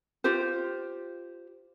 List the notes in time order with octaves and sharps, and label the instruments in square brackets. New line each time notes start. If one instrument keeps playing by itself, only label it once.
[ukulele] F4 G4 C5